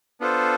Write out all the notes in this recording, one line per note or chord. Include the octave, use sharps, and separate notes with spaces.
B3 D4 F4 A4 C5